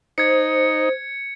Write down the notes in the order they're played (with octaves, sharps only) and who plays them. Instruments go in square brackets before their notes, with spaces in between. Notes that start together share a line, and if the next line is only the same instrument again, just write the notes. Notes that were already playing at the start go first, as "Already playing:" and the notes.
[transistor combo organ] D#4 [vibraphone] C5 [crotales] G#6 C#7